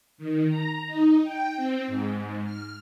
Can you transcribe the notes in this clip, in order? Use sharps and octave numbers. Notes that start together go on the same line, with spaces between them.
D#3
A#5
D#4
G5
C4
G#2
F6